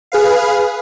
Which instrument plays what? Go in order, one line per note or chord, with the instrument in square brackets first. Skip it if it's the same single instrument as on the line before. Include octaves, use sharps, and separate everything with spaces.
[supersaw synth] G#4 B4 F5